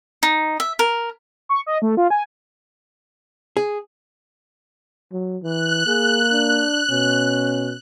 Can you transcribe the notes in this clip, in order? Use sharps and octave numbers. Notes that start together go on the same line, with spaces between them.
D#4
E5
A#4
C#6
D#5
A3
F4
G#5
G#4
F#3
E3 F#6
A#3 G#4
D4
B2 C#4